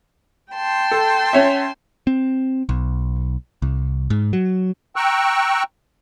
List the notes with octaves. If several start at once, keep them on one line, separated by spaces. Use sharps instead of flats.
G5 A5 C6
A4
C#4 C#5 E5
C4
B1
C2
G#2
F#3
G5 A#5 C#6 E6 F#6